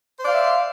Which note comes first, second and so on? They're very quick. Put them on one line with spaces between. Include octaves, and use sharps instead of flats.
C5 D5 F5 E5